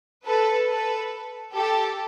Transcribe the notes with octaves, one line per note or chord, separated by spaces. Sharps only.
A4 B4
A4 B4
G4 A4